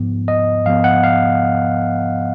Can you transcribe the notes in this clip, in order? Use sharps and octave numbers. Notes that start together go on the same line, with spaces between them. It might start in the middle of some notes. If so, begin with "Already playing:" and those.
Already playing: G#2 F3 B3
D#5
G#2 F3 B3 F5
F#5
F5